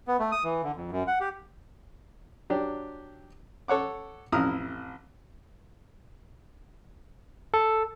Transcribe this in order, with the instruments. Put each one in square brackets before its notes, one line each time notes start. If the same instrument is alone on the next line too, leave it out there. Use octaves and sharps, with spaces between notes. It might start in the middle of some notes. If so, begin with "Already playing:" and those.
[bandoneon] B3
A3
D#6
E3
D3
F2
F#2
F#5
G4
[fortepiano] F#3 D4 G4
A4 C#5 F#5 D6
A1 F2 E4 A#5 D#6 F6
[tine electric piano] A4